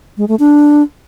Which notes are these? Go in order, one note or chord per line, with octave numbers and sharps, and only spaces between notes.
G#3
A3
D4